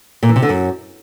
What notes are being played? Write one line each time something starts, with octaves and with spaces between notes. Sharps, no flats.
A#2
E3
C3
D3
F#2